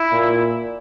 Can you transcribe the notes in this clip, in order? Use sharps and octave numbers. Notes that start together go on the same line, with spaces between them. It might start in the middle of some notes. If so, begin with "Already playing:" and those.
Already playing: E4
A#2